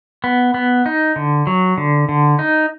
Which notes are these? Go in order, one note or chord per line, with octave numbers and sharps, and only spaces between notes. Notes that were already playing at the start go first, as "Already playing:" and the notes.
B3
B3
D#4
D3
F#3
D3
D3
D#4